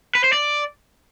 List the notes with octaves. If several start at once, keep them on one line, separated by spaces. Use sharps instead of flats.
B4
C5
D5